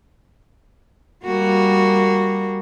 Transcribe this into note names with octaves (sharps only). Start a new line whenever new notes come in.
G3 A#3 F#4